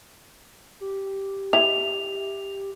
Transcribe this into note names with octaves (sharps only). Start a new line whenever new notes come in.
G4
E4 F7